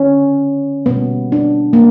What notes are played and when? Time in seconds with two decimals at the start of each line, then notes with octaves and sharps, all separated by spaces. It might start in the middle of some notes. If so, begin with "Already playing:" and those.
Already playing: D3 C#4
0.86 B2 G3 A#3 B3
1.32 D4
1.73 A#3